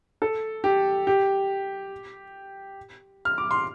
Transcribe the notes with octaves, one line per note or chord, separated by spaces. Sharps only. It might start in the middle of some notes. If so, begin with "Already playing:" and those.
A4
G4
G4
F6
D6
C6